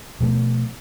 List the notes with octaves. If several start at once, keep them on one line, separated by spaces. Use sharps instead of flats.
B2 F3 A3 B3